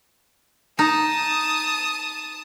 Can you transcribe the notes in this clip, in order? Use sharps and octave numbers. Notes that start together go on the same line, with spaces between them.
D#4 A5 D#6